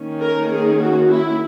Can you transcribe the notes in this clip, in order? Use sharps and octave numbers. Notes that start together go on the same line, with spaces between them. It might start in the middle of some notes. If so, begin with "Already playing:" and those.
Already playing: D#3 A#3 C#4
A#4
G#4
F#4
E4